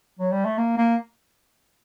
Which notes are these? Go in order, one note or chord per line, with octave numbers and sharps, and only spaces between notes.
F#3
G3
A3
A#3
A#3